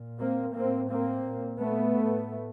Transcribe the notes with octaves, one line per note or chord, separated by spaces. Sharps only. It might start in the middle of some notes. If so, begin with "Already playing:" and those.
Already playing: A#2
A#3 C4
A2 A#3 C4
A#3 C4
A#2
A3 B3
A2